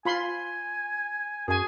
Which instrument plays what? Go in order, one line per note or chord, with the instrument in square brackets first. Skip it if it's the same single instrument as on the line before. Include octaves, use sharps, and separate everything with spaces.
[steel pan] F4 B5 C6 [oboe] G#5
[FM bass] F#2 [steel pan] F#4 G#5 [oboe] G#4